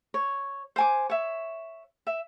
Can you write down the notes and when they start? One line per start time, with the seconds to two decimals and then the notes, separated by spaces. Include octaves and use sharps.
0.14 C#5
0.76 C5 G#5 D6
1.10 C#5 E5
2.07 E5